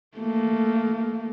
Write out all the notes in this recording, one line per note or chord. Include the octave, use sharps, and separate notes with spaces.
A3 A#3